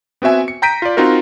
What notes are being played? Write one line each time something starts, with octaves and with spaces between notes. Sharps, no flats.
B3 C4 F#4 E5 G#5
C#7
G5 A#5 G6 B6 D7 D#7
F4 D5
C4 D#4 F4 F#4 A#4